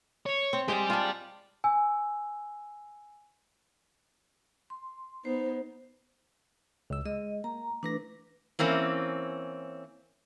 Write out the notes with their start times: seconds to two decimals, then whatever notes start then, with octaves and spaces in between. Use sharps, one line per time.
0.26 C#5
0.53 C4
0.68 G#3 G4 G#4 D5 G5
0.90 D4 F4
1.64 G#5 E6
4.70 C6
5.25 B3 D#4 C5
6.90 C#2 E6
7.06 G#3 D#5
7.44 A#3 A#5
7.83 E3 A3 D4 B4 A#6
8.59 E3 A#3 C4 C#4